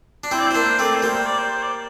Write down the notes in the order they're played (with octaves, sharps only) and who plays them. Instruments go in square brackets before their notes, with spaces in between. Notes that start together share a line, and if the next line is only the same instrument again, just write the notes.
[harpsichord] D4
[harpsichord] C4 E4 [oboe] C5
[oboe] D5
[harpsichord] E4 [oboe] C5
[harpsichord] A#3 D4
[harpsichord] A3 C4 [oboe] D5
[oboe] C5
[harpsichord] G3 A#3
[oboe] C5
D5
C5
C5
D5